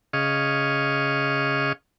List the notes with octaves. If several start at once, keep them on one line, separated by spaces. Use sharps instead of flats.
C#3 G#4 D#5 F5 C#6